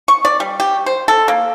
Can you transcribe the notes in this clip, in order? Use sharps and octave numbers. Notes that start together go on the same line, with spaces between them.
C#6
D5
G3
G4
C5
A4
A#3